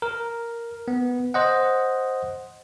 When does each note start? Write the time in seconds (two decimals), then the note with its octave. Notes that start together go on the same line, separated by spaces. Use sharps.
0.02 A#4
0.88 B3
1.34 C5 D#5 F#5